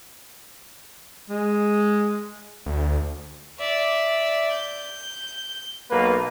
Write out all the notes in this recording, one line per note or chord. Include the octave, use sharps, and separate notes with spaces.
G#3
D2
D5 E5
G6
B1 A#3 B4